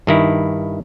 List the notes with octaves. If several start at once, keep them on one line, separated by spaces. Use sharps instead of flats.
G2 D#3 E4